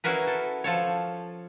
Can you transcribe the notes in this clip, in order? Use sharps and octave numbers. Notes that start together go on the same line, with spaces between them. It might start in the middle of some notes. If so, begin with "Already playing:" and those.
C#4 E4 F#4 G#4 A#4 B4
A4
F3 A4 C#5